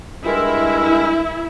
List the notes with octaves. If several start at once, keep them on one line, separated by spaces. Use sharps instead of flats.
G2 G#3 E4 A#4